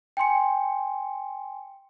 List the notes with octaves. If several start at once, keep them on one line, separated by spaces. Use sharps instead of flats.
G5 G#5 C6 C#7